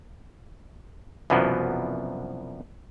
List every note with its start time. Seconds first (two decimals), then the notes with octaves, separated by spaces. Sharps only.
1.30 C2 F#2 B2 E3 F3 B3